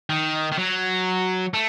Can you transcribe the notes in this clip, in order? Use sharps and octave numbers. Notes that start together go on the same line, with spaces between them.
D#3
D#3
F#3
A3